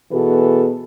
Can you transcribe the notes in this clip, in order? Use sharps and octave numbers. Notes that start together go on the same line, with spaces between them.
B2 E3 F#4 G#4 A4 B4